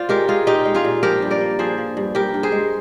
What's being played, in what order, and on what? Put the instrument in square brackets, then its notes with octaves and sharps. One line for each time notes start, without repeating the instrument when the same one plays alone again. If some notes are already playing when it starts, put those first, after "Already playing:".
Already playing: [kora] F4 C5 D5
G#3 G4 A#4
G#3 F4 G#4
A#2 D#4 G4
G#3
F4 G#4
A#2
F3 G4 A#4
G2
A#4 D5
A#3
F3 G#4 C5
F3
G2
G2 G4 A#4
G2
G#4 C5
G#3